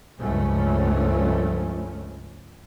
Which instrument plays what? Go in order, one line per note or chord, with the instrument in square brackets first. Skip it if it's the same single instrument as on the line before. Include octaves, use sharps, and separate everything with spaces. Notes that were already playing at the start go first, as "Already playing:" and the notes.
[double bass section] C#2 G2 F3 G#3 A3 C#4